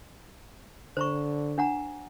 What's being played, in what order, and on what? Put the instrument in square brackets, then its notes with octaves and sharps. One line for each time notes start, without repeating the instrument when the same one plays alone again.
[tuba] D3 [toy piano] C5 A#5 C#6
[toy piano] D4 F#5 A#5